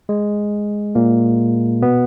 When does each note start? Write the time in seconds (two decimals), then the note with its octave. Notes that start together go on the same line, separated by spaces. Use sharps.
0.09 G#3
0.95 A#2 A#3
1.82 B2 B3